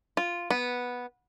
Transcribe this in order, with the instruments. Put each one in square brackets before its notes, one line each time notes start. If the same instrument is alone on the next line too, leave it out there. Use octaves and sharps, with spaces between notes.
[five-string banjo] F4
B3